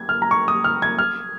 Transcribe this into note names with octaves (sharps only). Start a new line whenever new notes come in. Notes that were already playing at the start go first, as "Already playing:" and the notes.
Already playing: G#6
F6
A#5
C#6
D#6
F6
G#6
F6